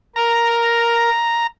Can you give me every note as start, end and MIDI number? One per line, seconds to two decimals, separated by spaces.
0.16 1.10 70
0.16 1.47 82